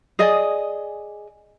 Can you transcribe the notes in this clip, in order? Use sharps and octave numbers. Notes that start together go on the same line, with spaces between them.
G#4 D5 D#5 G#5